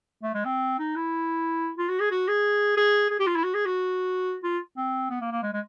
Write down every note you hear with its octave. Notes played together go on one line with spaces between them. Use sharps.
A3
G#3
C4
D#4
E4
F4
F#4
G#4
F#4
G#4
G#4
G#4
G4
F4
E4
F#4
G#4
F#4
F4
C4
B3
A#3
A#3
G#3
G#3